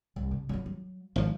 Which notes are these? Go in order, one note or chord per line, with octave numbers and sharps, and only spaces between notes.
C2
C3
F#3 F4
F#3
G#1 F3 F4